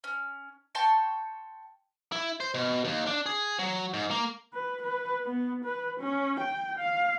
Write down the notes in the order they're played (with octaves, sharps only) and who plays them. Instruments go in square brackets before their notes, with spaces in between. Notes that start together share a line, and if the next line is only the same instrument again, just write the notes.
[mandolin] C#4
G5 A5 C6 C#6
[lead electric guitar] E4
C5
B2
D#2
D4
G#4
F#3
G#2
A#3
[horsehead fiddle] B4
B4
B3
B4
C#4
G5
F5